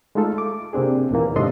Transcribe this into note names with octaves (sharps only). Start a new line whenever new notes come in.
G#3 A3 D#4 F4 A4
D6
C3 A#3 C4 D4 G#4
D#2 A#2 D#3 E3 A#3
G#2 C3 D4 A4 D#5 C6